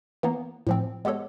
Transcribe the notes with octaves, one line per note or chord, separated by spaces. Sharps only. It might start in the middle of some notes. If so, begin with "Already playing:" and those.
E3 A#3 B3 A#5
A2 F3 C4
G#3 B3 G4 A4 C#5